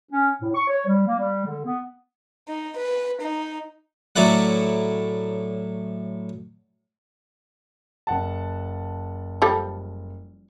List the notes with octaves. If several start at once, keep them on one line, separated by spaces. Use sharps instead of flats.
C#4
A2
C#6
C#5
G3
A#3
G3
D3
B3
D#4
B4
D#4
A2 F#3 E4 D5 F#5
F#1 F#5 A5
F3 G3 A4